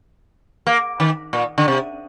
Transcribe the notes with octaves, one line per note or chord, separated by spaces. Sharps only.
A#3
D#3
A#2
D3
C3